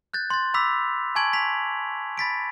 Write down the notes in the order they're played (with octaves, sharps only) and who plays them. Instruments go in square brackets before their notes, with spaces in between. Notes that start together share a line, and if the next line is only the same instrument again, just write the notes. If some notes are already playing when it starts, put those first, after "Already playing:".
[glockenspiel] F#6 G6 A6
C6 A6
B5 D6 E6 B6 F7
G#5 A5 C#6 G#6 D7 F#7
B6 F7
B5 A6 B6 D7